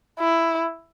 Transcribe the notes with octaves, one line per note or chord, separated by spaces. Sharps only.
E4